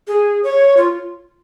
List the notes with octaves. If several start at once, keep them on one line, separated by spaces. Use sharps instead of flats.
G#4
C#5
F4